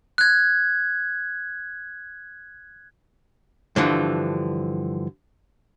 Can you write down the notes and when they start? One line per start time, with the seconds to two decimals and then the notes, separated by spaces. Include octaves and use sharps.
0.18 F#6 G#6
3.76 G2 D3 E3 F3